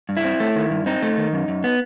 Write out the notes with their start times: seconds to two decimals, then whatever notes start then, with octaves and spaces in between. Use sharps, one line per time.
0.09 G2
0.17 E4
0.24 C4
0.40 A3
0.56 D#3
0.71 G2
0.86 C4 D#4
1.02 A3
1.17 D#3
1.33 F#2
1.48 F#2
1.64 B3